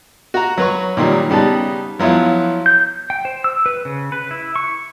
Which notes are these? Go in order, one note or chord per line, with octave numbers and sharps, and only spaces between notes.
F#4 A#5
F#3 B4 C#6
A#2 D#3 F#3 G3
C#3 G3 B3 D#4 A5
F3 F#3 B3 E4 F4
G6
G5
C5
E6
B4
C#3
B4
E4
C#6